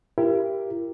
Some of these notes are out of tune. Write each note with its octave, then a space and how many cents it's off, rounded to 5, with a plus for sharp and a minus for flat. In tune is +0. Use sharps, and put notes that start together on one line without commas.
E4 +35 G4 +0 A#4 +5